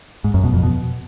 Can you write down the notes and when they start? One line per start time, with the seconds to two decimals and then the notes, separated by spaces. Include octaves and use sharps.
0.24 G#2
0.34 F#2
0.44 B2
0.53 F2
0.63 B2